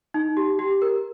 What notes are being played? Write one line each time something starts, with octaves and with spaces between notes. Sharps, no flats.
D#4
G4
G4
A#4